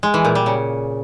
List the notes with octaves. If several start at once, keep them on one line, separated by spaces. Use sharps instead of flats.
G#3
E3
A#2
G3
C#3